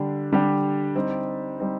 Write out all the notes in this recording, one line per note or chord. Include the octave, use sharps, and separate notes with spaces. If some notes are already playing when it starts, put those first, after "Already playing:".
Already playing: D3 G3 D4 G4
D3 G3 D4 G4
G3 C4 D#4
G3 C4 D#4